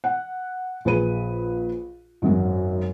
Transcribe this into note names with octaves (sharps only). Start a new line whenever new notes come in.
F#5
A#1 G#4 B4 D#7
G#1 F#2 F#3